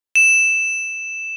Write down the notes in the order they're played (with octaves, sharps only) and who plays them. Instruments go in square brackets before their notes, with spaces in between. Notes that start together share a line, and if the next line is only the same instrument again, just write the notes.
[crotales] E7